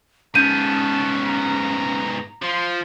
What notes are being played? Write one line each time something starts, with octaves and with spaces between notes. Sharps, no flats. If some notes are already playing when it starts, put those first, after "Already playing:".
G#2 B3 C#4 A5 G6 D#7
A#5
F3 C6